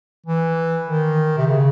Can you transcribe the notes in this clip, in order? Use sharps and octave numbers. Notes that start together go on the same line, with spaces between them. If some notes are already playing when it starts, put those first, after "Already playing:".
E3
D#3
C3
C#3